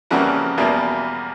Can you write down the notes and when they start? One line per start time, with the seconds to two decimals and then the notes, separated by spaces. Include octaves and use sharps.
0.11 F2 C#3 E3 G3 A#3 F#4
0.58 E2 B2 G3 A#3